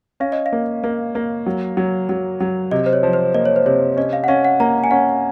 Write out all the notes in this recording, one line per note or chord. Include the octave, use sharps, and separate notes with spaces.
C#4 F5
D#5
F5
A#3
A#3
A#3
F#3
F#3
F#3
F#3
C3 D#5
C5
C#5
F3
C5
A#3 D#5
C#5
C5
C3 C#5
C#4 D#5
F5
F#5
C#4 F5
F#5
A#3 A#5
G#5
C#4 F#5